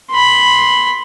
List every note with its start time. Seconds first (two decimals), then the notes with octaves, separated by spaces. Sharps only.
0.10 B5 C6